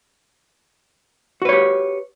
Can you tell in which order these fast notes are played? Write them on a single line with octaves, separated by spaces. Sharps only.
F#4 B4 C#5 G4